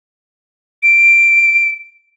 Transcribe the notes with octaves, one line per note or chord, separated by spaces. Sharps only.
D7